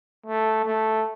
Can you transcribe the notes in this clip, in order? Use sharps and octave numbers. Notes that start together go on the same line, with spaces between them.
A3
A3